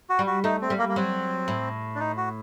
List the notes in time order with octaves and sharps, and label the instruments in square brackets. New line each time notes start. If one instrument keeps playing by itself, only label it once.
[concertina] F#4
[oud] G3
[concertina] F#4
[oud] A3 [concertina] D#4
[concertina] C4
[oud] G3
[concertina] A#3
A#3
[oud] F#3 [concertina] C4
[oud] A2
[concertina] D4
D#4
F#4